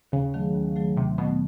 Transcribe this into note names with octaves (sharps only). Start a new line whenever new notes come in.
D#2 C#3
D#3 F#3 A3
D#2
D#3 F#3 A3
D#2 C3
B2 D#3 F#3 A3